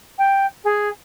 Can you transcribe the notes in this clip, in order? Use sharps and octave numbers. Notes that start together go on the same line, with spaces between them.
G5
G#4